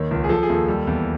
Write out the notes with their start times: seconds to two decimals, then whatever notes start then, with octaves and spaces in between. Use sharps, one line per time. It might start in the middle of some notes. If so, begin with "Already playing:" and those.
Already playing: D#2 D#3 C#5
0.11 C#2
0.24 G#4
0.29 F3 A4
0.43 G#4
0.49 D#2
0.55 A4
0.68 G3
0.87 E2